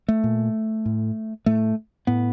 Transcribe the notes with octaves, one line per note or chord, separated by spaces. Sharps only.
A3
A#2
A2
A2 A3
A2 B3